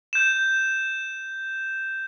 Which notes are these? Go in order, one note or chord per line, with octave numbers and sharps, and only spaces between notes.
G6 E7